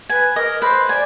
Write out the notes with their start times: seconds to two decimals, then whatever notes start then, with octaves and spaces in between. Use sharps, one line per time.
0.09 B4 G#5
0.36 A#4 D#5
0.62 B4 C5
0.89 D5 G#5